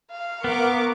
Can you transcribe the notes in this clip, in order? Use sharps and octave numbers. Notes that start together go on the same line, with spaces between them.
F5
B3 A#4 C#6 D6